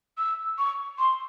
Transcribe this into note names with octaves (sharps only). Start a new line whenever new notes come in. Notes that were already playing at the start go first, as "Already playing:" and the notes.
E6
C#6
C6